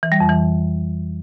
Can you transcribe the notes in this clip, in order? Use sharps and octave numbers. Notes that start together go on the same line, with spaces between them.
E3
G3
F2
E3